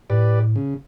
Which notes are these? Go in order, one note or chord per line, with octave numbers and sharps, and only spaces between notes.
A2 G4 B4 D5
C#3